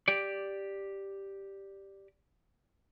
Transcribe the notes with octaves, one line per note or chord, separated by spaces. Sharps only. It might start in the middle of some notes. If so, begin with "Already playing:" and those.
G4 D5